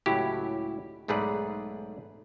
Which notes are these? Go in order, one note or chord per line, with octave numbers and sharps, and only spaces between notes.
C#2 A2 F#3 C#4 E4 G4
B1 G#2 A3 G#4 B4 D5